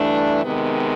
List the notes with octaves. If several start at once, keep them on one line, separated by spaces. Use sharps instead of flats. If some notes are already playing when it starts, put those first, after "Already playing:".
Already playing: G2 E3 A3 D4
C3 D#3 G#3 B3